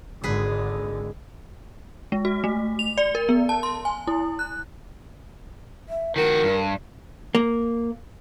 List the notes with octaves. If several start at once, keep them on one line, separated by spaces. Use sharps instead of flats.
G#1 D3 G#3 G#4 B4
G#3
F#4
A3
F7
D5
A#4
B3
A5
C6
G#5
E4
F#6
E5
D#3 F#4 A#4
G2
A#3